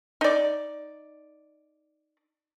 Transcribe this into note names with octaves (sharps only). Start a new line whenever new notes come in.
D#4 D5